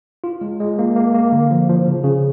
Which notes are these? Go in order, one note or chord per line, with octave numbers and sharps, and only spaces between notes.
F4
G#3
G#3
A#3
A#3
A#3
D3
F3
F3
C#3
C#3